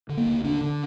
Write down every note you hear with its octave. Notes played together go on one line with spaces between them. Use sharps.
D3
A#3
D2
D3 D4
D3